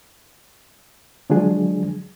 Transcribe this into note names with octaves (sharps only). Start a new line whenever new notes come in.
D3 F3 F#3 G#3 D4 G#4